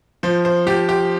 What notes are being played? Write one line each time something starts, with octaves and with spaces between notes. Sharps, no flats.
F3 C5
C5
F3 G4
G4